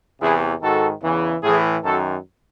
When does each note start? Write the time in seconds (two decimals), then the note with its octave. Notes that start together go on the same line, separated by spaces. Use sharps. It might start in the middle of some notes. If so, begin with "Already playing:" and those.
0.21 E2 C3 E3 E4 G#4
0.62 G#2 D#3 F#4 A4
1.02 E2 C#3 E3
1.43 A2 E3 E4 G#4
1.84 F#2 D#3 F#4 A4